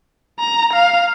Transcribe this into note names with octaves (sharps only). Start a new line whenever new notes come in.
A#5
F5